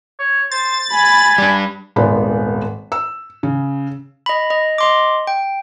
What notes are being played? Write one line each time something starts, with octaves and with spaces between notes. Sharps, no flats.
C#5
C5 A6
G#5 B5
G3 D4
D#1 G#1 G#3 B3 B5
E6
C#3
D#5 B5
D#5
D#5 C6 D6
G5